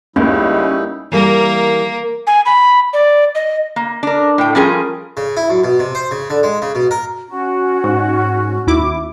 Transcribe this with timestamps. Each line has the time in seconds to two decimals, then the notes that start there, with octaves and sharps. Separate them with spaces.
0.16 C#2 G3 A#3 C#4 D#4 E4
1.12 E3 G3 A#3 A#4
2.27 G#5
2.46 B5
2.93 D5
3.35 D#5
3.76 A#3
4.03 D4 A#4
4.38 A2 G5
4.55 F3 G3 C#4 F4 G#4 A#4
5.17 C#3
5.37 E4
5.50 F#2
5.64 B2
5.80 C3
5.95 C5
6.11 C#3
6.30 D3
6.43 G#3
6.62 C#3
6.75 B2
6.91 A#4
7.28 C#4 F#4
7.84 G#2
8.67 D#2 E4 D6